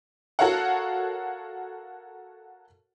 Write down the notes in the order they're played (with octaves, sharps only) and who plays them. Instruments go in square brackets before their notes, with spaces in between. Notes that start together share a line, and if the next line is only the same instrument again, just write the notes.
[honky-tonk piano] F#4 A4 A#4 C#5 F5 F#5